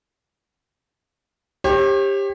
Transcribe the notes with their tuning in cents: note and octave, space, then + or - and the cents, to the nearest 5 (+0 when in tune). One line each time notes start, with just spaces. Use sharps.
G4 +15 C#5 -45